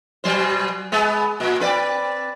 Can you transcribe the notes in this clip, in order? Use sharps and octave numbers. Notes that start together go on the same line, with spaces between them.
B2 F#3 C5
G#3 B3
A#2
C4 B4 D5